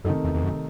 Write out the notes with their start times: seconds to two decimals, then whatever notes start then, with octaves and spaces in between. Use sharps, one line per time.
0.04 F#2 C3 D#3 A3 D#4 A4
0.24 E2
0.34 E2
0.43 F#2